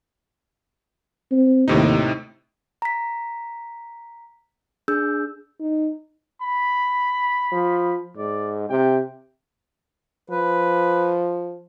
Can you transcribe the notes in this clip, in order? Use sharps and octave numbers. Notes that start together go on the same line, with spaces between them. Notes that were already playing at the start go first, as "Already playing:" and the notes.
C4
D#2 A2 C3 D#4
A#5 B6
D4 G#4 E6 G6
D#4
B5
F3
G#2 D5
C3 G5
F3 B4